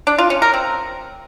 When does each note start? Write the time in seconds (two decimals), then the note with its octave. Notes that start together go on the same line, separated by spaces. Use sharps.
0.07 D4
0.18 F4
0.30 C#4
0.42 A#4
0.54 C4